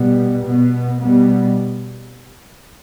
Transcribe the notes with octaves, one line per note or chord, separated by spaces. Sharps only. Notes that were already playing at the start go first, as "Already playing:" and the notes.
Already playing: B2 G3 B3
B2 B3
B2 G3 B3